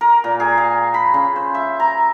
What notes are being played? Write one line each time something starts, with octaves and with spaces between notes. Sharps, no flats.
A#4
A#2
G#4
F5
B5
C#3
C5
E5
A#5